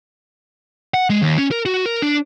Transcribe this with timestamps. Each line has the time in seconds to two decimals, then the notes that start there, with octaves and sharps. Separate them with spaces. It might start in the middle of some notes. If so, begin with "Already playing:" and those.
0.94 F#5
1.10 G#3
1.22 D#2
1.38 C#4
1.51 A#4
1.66 F#4
1.86 A#4
2.02 D4